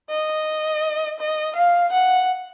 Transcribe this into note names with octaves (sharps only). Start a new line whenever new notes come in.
D#5
D#5
F5
F#5